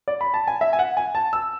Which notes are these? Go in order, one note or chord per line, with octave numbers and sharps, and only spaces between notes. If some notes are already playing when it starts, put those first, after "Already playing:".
D5
B5
A5
G#5
E5
G#5
F#5
G#5
A5
E6